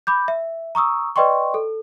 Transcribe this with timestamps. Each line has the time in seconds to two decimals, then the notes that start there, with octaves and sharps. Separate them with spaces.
0.07 B5 D6 G6
0.28 E5
0.75 A#5 C#6 D#6 E6
1.16 B4 D5 D#5 G5 C6 C#6
1.54 A4